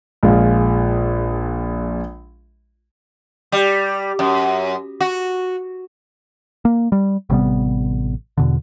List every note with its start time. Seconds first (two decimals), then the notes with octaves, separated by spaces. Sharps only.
0.23 A#1 F3 G#3 F4
3.52 G3
4.19 F#2
5.01 F#4
6.65 A#3
6.92 G3
7.30 A1 C3 G3 B3
8.37 E2 B2 D3